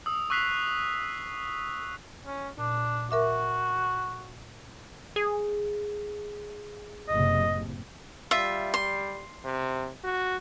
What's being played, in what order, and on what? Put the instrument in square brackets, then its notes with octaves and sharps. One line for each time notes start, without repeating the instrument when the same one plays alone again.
[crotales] D#6 E6
C#6 E6 F#6 B6 C7 F7
[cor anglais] C#4
[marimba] A#2 [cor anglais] D4
[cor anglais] F#4 [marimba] A#4 E5 D6
[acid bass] G#4
[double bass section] F#1 A2 C3 [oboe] D#5
[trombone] G3 [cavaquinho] F4 E5
[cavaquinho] C6
[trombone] C3
F#4